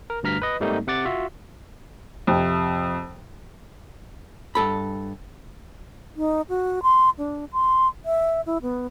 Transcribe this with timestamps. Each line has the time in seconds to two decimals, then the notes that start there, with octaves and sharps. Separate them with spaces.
0.10 A#4
0.23 D2 G2 A#5 F6 B6
0.42 B4 D#5
0.60 G#2 G3 A3 A#3 C4 D#4
0.87 C3 F#5 D6 A6
1.05 F4 F#4 E5
2.27 F2 C3
4.55 G2 A4 B5
6.16 D#4
6.49 F#4
6.83 C6
7.18 D4
7.53 C6
8.05 E5
8.46 E4
8.62 B3